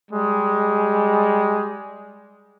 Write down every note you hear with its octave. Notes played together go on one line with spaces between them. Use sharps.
G3 G#3